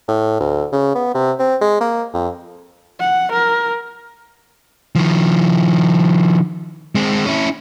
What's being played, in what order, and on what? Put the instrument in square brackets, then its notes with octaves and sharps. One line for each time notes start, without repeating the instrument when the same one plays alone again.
[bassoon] A2
D2
C#3
B3
C3
C4
G#3
A#3
F2
[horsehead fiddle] F#5
A#4
[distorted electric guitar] D#3 F3
G#3 C4
C#4 E4